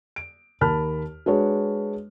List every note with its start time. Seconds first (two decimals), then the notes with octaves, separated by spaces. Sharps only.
0.16 D7
0.61 D#2 A#4 A5 B5 F6
1.26 G#3 D4 F#4 B4 C#5